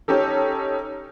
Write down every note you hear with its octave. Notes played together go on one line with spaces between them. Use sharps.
C#4 D#4 G4 A4